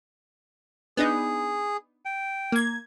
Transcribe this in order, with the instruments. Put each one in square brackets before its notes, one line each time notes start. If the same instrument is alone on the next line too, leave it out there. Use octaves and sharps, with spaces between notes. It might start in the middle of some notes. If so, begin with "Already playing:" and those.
[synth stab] B3 D4 D#4 [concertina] G#4
[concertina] G5
[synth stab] A#3 G#6